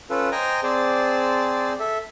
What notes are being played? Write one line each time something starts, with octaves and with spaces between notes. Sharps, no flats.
C#4 F4 A4 B4
C5 D#5 G5 G#5 A#5
C4 G#4 C5 D5 A5
A4 E5